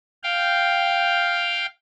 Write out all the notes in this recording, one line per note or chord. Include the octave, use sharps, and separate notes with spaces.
F5 G5